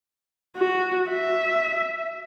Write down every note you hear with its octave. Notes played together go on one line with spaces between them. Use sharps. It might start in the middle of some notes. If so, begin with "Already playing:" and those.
F#4
E5